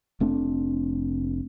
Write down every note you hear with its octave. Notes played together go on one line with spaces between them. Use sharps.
F1 A3 C4 D4